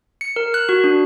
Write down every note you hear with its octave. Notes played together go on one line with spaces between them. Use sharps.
C#7
A#4
F#6
F#4
D4